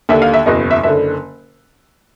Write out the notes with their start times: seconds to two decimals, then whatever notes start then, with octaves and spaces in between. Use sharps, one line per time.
0.09 D#2 D3 E5
0.22 F5
0.34 E5
0.46 F#1 E2 B2 D#5
0.71 E5
0.83 F#1 D3 E5